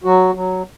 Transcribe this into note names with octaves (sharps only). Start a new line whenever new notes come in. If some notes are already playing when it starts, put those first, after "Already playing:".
F#3 F#4
F#3